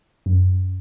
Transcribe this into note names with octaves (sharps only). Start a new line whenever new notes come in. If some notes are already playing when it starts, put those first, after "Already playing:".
F#2